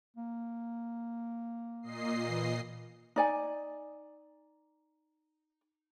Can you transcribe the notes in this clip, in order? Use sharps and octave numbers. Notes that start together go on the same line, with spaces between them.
A#3
A#2 D#5 C7
E3
D#4 D5 G#5